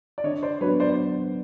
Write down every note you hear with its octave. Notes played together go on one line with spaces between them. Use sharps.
D5
D3 C#5 D#5
C5 D5
F#3 B3 D4 F#4 B4 C#5
C5 D5